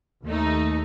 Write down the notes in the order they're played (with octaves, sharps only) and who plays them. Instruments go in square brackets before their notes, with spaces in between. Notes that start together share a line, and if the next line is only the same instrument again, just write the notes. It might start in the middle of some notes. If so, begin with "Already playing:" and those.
[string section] D#2 A3 D#4